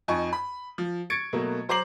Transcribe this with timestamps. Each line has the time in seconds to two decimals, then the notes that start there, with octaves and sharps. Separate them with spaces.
0.08 F2 D#4 G#5 C#6
0.33 B5
0.78 F3
1.10 C#6 G#6 A6 C#7 D7
1.33 B2 F#3 A3 A#3
1.69 F#3 C5 A#5 D6 C7 F#7